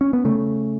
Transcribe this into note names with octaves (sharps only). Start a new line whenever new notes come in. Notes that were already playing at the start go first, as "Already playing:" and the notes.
C#4
B3
C#3 A3